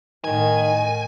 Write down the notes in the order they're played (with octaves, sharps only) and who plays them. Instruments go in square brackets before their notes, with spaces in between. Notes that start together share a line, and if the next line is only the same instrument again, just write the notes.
[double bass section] A2 [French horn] D#3 [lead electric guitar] G#5